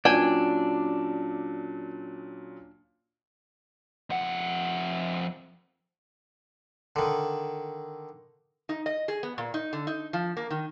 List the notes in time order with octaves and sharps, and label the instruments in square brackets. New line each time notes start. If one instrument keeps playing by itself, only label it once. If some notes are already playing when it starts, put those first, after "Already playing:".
[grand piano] A#2 F#3 C#4 [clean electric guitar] D4 [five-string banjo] G5 G#5
[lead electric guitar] F2 F#5
[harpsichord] D3 D#3
[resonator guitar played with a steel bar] D#4
D#5
G#4
B3
A#2
D#4
D3
D#4
F3
A#3
D#3